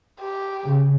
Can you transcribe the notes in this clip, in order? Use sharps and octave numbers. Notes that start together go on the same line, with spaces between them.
G4
C#3